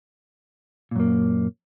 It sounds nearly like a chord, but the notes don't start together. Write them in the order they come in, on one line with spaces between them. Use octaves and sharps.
A#2 F#2 A#3